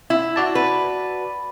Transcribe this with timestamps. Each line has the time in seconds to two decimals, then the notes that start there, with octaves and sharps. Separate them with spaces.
0.10 E4
0.36 F#4 D5 A5
0.55 B4